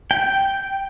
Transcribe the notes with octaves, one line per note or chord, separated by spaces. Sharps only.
G5